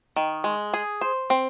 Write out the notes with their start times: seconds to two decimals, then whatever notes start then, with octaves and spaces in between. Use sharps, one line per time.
0.16 D#3
0.44 G#3
0.73 G#4
1.01 C5
1.30 C4